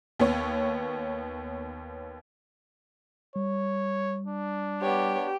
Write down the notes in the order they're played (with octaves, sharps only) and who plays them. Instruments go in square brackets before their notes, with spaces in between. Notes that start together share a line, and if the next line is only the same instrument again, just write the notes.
[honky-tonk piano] D#2 B3 C#5
[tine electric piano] G3 [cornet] C#5
[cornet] D4
[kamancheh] B3 C#5 [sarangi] G4